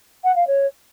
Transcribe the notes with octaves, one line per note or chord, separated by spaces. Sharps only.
F#5
F5
C#5